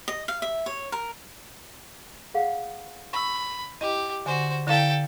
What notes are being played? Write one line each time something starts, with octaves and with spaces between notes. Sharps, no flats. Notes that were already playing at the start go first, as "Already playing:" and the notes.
D#5
F5
E5
C#5
A#4
G#4 F5 F#5
B5 C#6 E6
E4 G4 D#5
D3 F#4 C5 G#5
D3 E4 A4 F5 G5